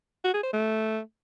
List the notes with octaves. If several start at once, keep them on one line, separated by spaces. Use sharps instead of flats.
F#4
G#4
C5
A3